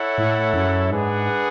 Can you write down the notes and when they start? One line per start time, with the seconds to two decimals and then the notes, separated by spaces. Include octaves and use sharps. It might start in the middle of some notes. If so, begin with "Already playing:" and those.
Already playing: E4 A4 C#5 F#5
0.18 A2
0.54 F#2
0.91 G#2 D4 G#4 B4 F#5